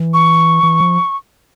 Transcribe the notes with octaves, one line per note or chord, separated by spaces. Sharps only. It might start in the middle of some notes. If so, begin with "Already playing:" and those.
Already playing: E3
C#6
E3
F3